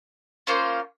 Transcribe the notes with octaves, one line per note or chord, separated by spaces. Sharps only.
A#3 C#4 F4 C5